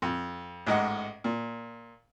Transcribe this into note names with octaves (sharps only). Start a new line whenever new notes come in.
F2
A1 G#2 D#5 F#5
A#2